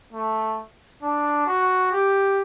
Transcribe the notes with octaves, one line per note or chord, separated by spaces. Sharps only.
A3
D4
F#4
G4